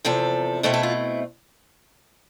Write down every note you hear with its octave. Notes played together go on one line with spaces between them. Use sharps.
E2 C3 F3 A4
B2 A3 C4 E4 A4
A4
F4